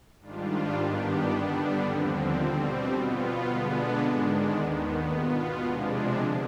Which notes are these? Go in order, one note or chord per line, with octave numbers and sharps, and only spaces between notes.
G#2 D#3 G3 D4 F4
G2 D#3 B3 D4 G4
D3 G3 B3 D4
D#2 D3 F3 C4
B2 G3 C4
B2 B3 F4
D3 G#3 B3 D4
G#2 D#3 G#3 D4
D#2 D#3 B3
B2 B3 F4
C3 F3 G#3 D4
D3